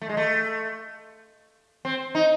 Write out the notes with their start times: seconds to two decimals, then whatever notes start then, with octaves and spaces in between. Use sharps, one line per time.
0.02 A3
0.09 G#3
0.17 A3
1.85 C4
2.15 D#4